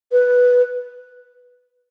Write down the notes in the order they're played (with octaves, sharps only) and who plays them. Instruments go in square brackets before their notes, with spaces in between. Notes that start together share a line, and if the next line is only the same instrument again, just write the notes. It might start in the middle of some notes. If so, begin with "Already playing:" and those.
[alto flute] B4